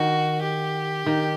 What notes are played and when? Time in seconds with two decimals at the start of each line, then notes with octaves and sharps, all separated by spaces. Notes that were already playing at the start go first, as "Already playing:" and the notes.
Already playing: D#3 F#4
0.42 G4
1.06 D#3